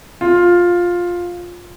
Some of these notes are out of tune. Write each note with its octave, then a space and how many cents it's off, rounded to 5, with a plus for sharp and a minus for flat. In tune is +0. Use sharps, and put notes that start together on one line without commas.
F4 +10